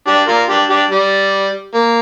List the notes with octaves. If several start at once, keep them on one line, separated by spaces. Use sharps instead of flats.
D4 G4
F4 A#4
D4 G4
D4 G4
G3
A#3